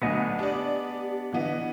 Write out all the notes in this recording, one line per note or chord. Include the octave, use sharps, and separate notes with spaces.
B1 D3 A3 B3 D#5 G#5
D4 G4 D5
D3 E3 B3 D#5